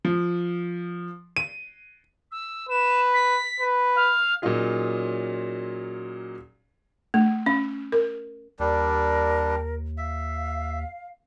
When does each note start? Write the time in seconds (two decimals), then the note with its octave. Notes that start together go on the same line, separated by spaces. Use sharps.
0.05 F3
1.36 D#7
2.31 E6
2.69 B4 E7
3.13 B6
3.60 B4
3.95 F5
4.42 A#2 F#3 C#4 D#4 F4 G#4
7.14 A3
7.46 C#4
7.92 A#4
8.59 D#2 G3 D4 A#4
9.98 E5 F5